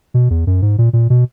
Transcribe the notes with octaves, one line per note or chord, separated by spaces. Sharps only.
B2
E2
F#2
G#2
A#2
A#2
B2